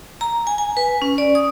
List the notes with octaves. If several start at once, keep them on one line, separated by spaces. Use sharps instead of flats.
A#5
G#5
G#5
B4
C#4
D5
D#6